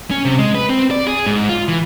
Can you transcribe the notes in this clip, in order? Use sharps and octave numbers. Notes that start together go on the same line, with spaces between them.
C#4
C3
G#3
B4
C4
D5
G#4
G#2
F4
E3